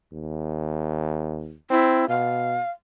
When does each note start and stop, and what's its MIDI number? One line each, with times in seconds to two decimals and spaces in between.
0.13 1.56 39
1.71 2.07 60
1.71 2.06 64
2.09 2.59 47
2.09 2.69 77